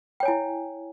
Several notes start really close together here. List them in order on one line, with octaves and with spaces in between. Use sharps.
G5 C#5 G#5 E4